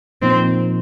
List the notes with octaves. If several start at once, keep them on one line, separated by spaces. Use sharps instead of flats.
A#2 F3 A#3 C4 D#4